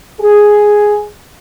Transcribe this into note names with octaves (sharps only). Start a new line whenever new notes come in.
G#4